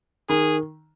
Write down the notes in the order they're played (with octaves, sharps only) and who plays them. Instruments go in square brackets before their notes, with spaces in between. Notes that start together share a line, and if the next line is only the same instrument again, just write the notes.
[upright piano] D#3 [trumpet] G#4